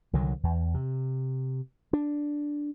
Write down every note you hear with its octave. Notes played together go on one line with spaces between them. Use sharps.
C2 D3 D#3 F#3
E2
C3
D4